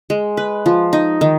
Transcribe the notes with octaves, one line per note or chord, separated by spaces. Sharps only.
G#3
B4
F3
D#4
D#3